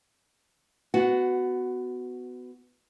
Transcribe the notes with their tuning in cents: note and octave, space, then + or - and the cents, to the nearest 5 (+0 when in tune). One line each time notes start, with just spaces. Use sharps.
B3 +20 F#4 +0